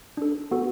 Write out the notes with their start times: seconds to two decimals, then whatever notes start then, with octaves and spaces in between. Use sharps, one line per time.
0.17 D4 A4
0.51 B3 F#4 A4